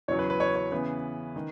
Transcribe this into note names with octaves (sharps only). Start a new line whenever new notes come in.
E2 C#3 F#3 C#5
B4
B4
C#5
C#5
C#3 E3 B3 B4
D#3